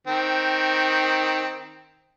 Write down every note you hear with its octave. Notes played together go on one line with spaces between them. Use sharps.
D#3 C4